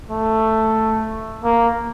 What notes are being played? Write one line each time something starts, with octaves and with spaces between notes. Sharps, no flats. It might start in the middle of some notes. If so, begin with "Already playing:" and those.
A3
A#3